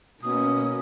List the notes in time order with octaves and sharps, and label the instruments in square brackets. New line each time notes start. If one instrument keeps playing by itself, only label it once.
[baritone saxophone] B2 [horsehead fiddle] A#3 C#4 [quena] D#6